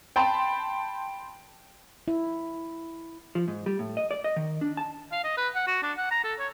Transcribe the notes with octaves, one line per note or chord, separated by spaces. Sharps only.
G5 A5 B5 C6
E4
F3
G#2
G3
A2
D#5
D5
D#5
D#3
D4
A5
F5
D#5
B4
F#5
F#4
D4
F#5
A#5
A4
C#5